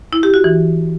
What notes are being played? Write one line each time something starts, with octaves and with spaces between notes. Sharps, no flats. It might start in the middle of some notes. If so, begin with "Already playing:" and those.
E4
G4
F#4
E3